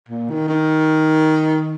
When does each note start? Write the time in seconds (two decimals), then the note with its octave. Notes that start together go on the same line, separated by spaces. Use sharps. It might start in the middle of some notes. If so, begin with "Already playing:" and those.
0.09 A#2
0.30 D#3
0.49 D#3